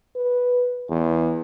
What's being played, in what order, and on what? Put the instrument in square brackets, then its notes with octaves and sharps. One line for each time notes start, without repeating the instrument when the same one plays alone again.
[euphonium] B4
E2